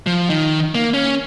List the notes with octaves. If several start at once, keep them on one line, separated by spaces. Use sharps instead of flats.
F3
D#3
A#3
C#4